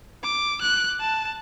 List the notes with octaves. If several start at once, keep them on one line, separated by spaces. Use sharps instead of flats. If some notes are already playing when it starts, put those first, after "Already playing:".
D6
F#6
A5